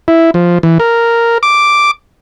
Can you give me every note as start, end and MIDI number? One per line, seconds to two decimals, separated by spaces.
0.08 0.31 64
0.34 0.58 53
0.63 0.78 52
0.80 1.38 70
1.43 1.91 86